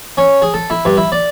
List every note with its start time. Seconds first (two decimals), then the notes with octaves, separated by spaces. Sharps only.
0.17 C#4
0.42 G#4
0.54 A4
0.70 E4
0.85 G2
0.97 E4
1.12 D5